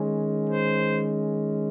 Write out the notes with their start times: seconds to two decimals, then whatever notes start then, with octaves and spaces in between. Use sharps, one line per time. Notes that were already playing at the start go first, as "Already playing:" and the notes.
Already playing: D#3 G#3 C#4
0.48 C5